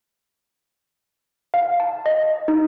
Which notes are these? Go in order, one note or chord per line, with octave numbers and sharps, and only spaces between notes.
F5
A5
D#5
D#4